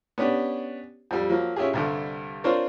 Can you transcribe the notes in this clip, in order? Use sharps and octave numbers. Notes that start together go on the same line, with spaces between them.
B3 C#4 D4 G4
F2 G3
F3 F#3 A#3
C#4 E4 F4 G4 G#4
C2 G2 D3
C4 D4 F4 A#4 C5 C#5